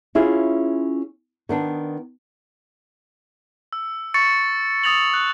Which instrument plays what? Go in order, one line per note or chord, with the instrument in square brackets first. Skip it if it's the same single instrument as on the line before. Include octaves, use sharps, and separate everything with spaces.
[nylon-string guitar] C#4 E4 F4 G#4
D#3 B3 D4
[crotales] E6
C#6 A6 C#7
D#6 A6 F7 F#7
F#6